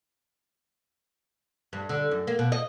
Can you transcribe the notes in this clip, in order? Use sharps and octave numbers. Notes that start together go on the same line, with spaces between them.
G2
D3
F#2
A#3
B2
D#5